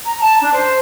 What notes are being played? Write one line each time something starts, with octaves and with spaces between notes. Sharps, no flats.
A#5
A5
D4
C5